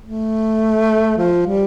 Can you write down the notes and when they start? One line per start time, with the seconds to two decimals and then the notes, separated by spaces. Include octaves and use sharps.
0.03 A3
1.17 F3
1.46 G3